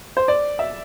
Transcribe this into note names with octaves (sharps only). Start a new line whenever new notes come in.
C5
D5
E5